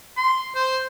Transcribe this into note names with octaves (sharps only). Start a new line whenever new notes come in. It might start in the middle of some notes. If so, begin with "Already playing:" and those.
C6
C5